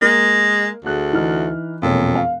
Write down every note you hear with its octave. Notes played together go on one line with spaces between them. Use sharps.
G#3 A#3
D2 G#4 F#6
E3 D#4 F6
E1 F2 A#2 C#5
F5